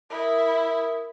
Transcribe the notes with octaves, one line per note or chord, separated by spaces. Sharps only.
E4 A#4 D#6